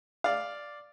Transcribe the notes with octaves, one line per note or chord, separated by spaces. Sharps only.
D5 F5